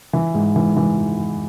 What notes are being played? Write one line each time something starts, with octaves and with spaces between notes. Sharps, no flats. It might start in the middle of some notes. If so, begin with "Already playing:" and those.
E3
G#2
E3
E3